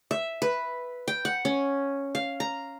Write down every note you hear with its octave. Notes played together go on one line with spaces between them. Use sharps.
E5
B4
G5
F#5
C#4
F5
A#5